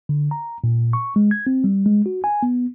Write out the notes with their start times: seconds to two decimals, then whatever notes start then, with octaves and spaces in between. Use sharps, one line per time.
0.09 D3
0.31 A#5
0.64 A#2
0.93 C#6
1.16 G#3
1.31 G#6
1.47 C4
1.64 G3
1.86 G#3
2.06 F#4
2.24 G#5
2.43 B3